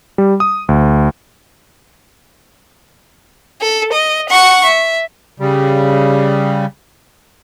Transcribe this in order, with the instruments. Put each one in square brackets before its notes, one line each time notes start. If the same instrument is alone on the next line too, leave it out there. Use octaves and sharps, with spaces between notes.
[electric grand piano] G3
D#6
D2
[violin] A4
D#5
F#5 C#6
E5
[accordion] C#3 G3